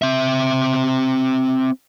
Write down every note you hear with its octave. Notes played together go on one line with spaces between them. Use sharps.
C4 E5